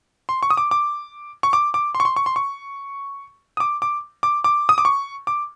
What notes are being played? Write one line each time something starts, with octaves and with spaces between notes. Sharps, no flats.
C6
C#6
D#6
D6
D6
C#6
D6
D6
C6
C#6
C6
C#6
C6
C#6
D#6
D6
D6
D6
D6
D#6
D6
C#6
D6